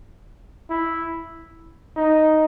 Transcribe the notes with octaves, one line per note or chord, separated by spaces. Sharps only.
E4
D#4